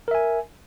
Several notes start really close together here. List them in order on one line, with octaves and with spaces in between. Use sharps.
A#4 E5 G#5